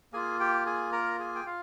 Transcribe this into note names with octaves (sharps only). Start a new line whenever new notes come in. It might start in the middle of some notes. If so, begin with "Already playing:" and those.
A#3 F4 G#4 G#5
G4 G5
G#4 G#5
A#4 A#5
G#4 G#5
G5
F4 F5